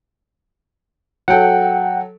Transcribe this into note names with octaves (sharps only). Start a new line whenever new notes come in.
F#3 A4 F#5 G5